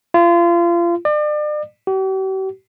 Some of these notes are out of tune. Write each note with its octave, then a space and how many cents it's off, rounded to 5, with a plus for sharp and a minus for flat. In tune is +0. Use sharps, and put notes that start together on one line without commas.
F4 -30
D5 +40
G4 -45